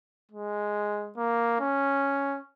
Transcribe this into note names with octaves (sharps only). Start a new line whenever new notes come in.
G#3
A#3
C#4